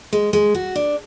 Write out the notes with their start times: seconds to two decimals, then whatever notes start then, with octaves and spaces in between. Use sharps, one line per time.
0.13 G#3
0.33 G#3
0.55 F#4
0.76 D4